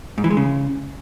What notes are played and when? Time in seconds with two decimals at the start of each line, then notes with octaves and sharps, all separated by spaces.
0.18 G#2
0.24 E3
0.30 G#3
0.37 C#3